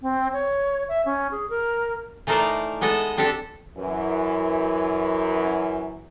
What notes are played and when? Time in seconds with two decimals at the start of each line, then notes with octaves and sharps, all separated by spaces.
0.01 C4
0.33 C#5
0.89 E5
1.05 C#4
1.31 G#4
1.50 A#4
2.27 E3 A3 D#4 A#4 C5 D5
2.81 G#3 B3 A4 D#5
3.17 C4 D4 G4 A4
3.77 F#2 E3